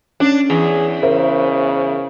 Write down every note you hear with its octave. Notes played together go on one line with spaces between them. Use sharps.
C#4 D4
E2 G#4
C#3 A#4 C5 E5